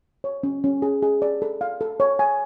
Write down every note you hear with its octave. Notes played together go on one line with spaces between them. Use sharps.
C#5
C#4
C#4
G#4
G#4
D5
A4
F5
A4
C#5
G#5